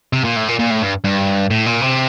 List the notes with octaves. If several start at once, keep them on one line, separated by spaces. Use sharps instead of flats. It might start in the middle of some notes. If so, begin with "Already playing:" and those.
C3
A#2
A2
A#2
A#2
A2
G2
G2
A2
A#2
C3